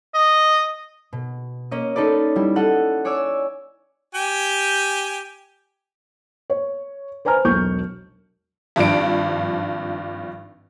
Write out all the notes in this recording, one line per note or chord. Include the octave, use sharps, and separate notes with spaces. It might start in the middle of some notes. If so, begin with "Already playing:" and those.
D#5
B2
A#3 C#4 D#5
C#4 D#4 A4 B4 D5
G3 E4
A4 D#5 F#5 F#6
C#5 D5 G#5 D6 E6
G4 G5 G#5
C#5
B4 C5 G#5 A#5 F6
E1 B1 C#6 G6
G#1 G2 F3 D4 D7